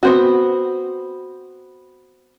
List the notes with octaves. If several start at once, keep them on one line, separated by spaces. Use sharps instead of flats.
B3 C4 F#4